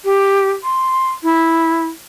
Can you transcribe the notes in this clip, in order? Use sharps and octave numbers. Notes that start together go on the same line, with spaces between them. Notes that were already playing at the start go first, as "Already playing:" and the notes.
G4
C6
E4